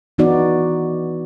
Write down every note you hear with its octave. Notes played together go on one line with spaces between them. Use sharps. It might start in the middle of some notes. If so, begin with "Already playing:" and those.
E3 B3 D#4 F#4 D5